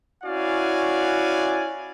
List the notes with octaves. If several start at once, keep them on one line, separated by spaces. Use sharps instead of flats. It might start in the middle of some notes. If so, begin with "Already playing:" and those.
C#4 E4 F#4 D5 F5 G#5